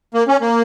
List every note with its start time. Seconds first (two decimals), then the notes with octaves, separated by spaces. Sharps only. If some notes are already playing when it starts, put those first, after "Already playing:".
0.14 A#3
0.28 C#4
0.41 A#3